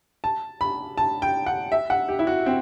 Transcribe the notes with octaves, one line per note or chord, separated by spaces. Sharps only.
A5
B5
A5
G5
F#5
E5
F#5
G4
E4
F#4
C4